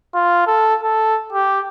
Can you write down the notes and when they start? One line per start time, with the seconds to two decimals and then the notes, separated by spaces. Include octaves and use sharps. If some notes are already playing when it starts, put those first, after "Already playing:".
0.14 F4
0.47 A4
0.83 A4
1.32 G4